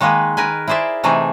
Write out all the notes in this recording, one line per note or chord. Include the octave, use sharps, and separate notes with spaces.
D#3 G#3 A#3 G#4 B4
A#4 B4 G#5
E4 G#4 C5 D5 E5
C3 E3 A3 D#4 G#4